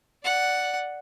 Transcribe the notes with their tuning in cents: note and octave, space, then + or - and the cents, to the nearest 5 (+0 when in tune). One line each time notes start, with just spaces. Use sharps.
D5 +0 F#5 +0